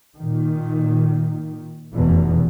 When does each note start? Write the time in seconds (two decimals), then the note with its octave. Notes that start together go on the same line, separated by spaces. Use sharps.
0.17 A#2 D#3
1.95 F1 E2 B2